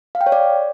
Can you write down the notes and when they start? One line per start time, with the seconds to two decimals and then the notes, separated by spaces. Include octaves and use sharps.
0.15 F5
0.21 G5
0.26 C#5
0.32 D5